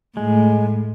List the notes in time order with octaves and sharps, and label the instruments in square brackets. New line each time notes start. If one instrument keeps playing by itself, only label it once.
[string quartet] A2 [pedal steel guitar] G#3